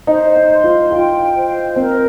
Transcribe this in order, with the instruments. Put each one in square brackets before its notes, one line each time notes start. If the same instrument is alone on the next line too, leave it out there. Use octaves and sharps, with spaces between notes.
[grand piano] D#4 [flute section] C5
[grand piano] D#4
[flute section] C6
[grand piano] F4
[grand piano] F4 [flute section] G5
[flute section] C5
[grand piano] C4 [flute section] A#4